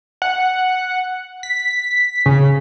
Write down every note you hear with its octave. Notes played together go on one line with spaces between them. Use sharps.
F#5
B6
C#3